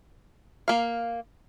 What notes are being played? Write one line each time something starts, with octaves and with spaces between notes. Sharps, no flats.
A#3 F5